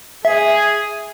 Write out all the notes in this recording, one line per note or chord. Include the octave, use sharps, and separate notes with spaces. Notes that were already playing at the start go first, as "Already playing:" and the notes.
G#4 E5